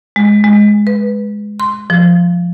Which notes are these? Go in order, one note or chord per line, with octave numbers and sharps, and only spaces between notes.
G#3
G#3
B4
C6
F3